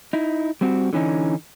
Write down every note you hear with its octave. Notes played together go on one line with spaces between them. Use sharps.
D#4 E4
G3 C4 F#4
D3 E3 C#4 D#4